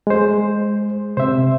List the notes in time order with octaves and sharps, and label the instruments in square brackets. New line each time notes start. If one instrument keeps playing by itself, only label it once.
[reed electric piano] G#3 C5
[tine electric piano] C3 C4 [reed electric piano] C5 E5